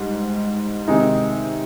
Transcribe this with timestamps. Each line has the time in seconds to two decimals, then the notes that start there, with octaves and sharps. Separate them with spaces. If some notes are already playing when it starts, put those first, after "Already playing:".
Already playing: G#2 G3
0.88 C3 D#3 G#3 C4 D#4